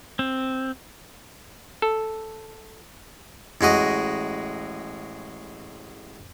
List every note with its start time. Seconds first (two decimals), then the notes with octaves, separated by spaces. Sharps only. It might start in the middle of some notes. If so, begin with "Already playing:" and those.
0.19 C4
1.82 A4
3.61 A1 G#3 F#4 D#5